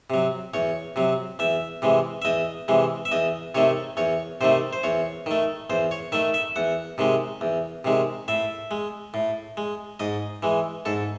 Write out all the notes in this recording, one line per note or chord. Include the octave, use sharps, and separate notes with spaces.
C3 F#3
E2 C#5
C3 F#3
E2 E5
C3 E3 G#3
E5
E2 D#5
C3 E3 G#3
E5
E2 D#5
C3 D#3 A3 C#5
E2 C#5
C3 D#3 A3 C5
C5
E2 C#5
D#3 A3
E2 C5
C#5
D#3 A3 E5
E5
E2 F#5
C3 D#3 G#3
E2
C3 D#3 G#3
A2 E5
G#3
A2
G#3
G#2 D#5
E3 G#3
G#2 A4